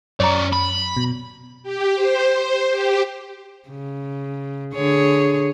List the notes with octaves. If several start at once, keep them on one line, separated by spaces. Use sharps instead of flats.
F#2 C#4 C#5 D5 A#5
B5
B2
G4
C5
C5
G4
C#3
D3 G#4 C#5